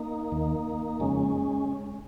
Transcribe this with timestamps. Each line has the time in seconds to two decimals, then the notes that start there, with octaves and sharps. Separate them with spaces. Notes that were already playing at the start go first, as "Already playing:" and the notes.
Already playing: A#3 D#4
0.32 D#2 D#3
1.00 F2 C#3 G#3 C#4